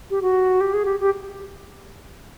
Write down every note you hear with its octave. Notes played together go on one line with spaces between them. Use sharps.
G4
F#4
G4
G#4
G4
G4